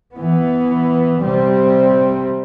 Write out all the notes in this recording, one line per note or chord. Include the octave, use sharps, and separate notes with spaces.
E3 B3
C3 G3 C4